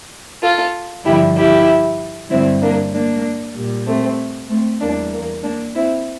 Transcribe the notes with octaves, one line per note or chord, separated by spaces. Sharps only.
F4 A4
G2 D3 F3 E4 G4
E4 G4
G2 D3 G3 C4 E4
A#3 D4
A#3 D4
A#2 G3
A3 C4
A3 C4
E2 E3 G3 A#3 D4
A#3
A#3 D4
C4 E4